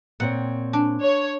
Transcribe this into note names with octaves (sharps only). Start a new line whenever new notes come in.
A#2 C4 C#5 F#5
D4
C#5